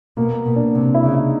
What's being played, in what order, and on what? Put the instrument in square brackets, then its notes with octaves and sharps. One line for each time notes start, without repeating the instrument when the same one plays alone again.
[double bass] B2 [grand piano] A#3
[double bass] B2
[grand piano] D4
[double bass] C3
[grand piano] E4
[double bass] C#3
[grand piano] D#4